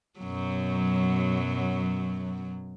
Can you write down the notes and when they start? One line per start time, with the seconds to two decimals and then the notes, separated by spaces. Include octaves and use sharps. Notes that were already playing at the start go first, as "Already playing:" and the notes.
0.20 F#2 B2 F#3